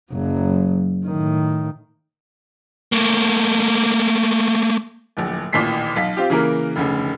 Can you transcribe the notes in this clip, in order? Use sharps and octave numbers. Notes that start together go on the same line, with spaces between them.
F#1 F#3
A2 D#3
A3 A#3
D1 A#1
A1 D#2 A#2 E3 B6 C7
B1 F5 B6
C4 F4 G4
C#3 E3 A#3 A#4
F1 D2 C#3